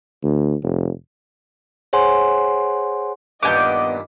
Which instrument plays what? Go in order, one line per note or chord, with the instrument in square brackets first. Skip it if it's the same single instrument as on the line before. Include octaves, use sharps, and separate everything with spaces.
[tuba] D2
F1
[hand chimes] G#4 C5 C#5 F#5 G#5 C6
[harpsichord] G2 A#2 D#3 [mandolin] B3 G#5 G6 [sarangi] D#5 [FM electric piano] D6